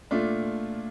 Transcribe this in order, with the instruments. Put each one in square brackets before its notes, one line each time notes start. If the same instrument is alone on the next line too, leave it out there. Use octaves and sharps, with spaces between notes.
[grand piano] A#2 A3 D4 F4